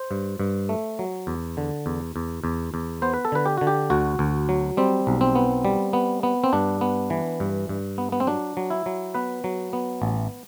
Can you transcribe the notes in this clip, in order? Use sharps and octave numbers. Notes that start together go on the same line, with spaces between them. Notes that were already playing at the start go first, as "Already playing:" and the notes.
Already playing: C5
G2
G2
A3
F#3
E2
D3
E2
E2
E2
E2
B3 C5
B4
A4
D3 B4
G4
D3 F#4
G4
D2 F#4
D2
F#3
G3 C4
B1
C4
B3
G3
B3
B3
C4
G2 D4
B3
E3
G2
G2
B3
B3
C4
F#3 D4
F#3
E4
F#3
B3 B4
F#3
B3
A1